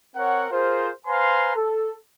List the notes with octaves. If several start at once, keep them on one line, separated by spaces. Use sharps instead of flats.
C4 A#4 C#5 F#5
F4 G#4 A#4 C5
B4 C5 F5 G#5 A#5 C6
A4